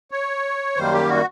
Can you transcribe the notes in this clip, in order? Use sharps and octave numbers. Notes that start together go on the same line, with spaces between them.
C#5
F#2 D#3 G3 A#3 C5
G4
F#4